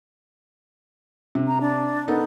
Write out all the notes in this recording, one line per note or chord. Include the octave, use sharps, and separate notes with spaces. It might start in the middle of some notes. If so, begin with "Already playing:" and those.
C3
A#5
D4
B3 D#4 A4